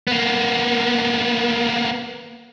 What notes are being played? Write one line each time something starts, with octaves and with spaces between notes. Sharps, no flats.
A#3 B3